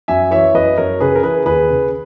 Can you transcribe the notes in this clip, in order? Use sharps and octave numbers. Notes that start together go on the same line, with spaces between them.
F#2 E5 G#5
E3 C#5 E5
F#2 B4 D#5
F#2 A#4 C#5
C#3 G#4 B4
A#4
E3 G#4 B4
D#2 G#4 B4
C#3